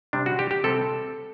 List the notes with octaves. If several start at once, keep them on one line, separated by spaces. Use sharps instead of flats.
C3 G3 C4 D4
F#4
G4
G4
C3 G3 C4 A4